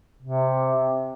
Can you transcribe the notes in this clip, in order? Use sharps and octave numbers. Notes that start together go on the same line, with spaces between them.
C3